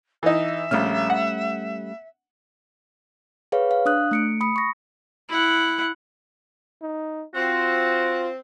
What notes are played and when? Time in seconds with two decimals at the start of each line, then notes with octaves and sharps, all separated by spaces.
0.23 E3 D#4 E5
0.71 A#1 G3 A3 C#4 F6
1.10 F#5
3.52 G#4 B4 C#5 F5
3.71 F5
3.85 D4 D#6 F#6
4.11 A3 C#7 D7
4.41 B5 D#6 C#7
4.56 C#6 A#6
5.29 E4 F#5
6.82 D#4
7.35 C4 F4 F#4